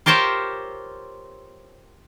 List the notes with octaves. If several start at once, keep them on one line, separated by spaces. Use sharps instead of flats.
F4 G4 A#4 C5 C#5 E5